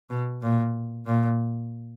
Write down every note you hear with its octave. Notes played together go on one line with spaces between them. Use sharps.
B2
A#2
A#2